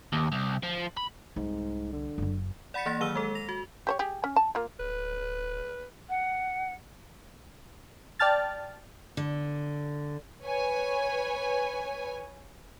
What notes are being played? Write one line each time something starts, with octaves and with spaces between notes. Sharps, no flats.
D#2
C2
F3
B5
C2 G#2
D3
F#1 F#3
D5 F#5 B5 A6 B6 C#7
E3 A#3 A6 A#6
D#3 F#3 E6 F6 D#7 G7
G#3 A4
A#6 F7
F#4
G4 C5 C#5
G4 G#4
C#4
A5
A#3 F4
D1 B4
F#5
D5 G5 A5 F6 A6
D3
B4 C#5 G#5